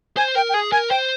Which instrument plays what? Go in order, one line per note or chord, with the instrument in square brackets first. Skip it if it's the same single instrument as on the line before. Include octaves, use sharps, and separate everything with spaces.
[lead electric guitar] C5 [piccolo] G#5
[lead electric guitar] A#4 [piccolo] G5
[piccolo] G5
[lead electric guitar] G#4 [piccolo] G#5
[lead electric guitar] A#4 [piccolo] G#5
[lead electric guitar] C5 [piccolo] G5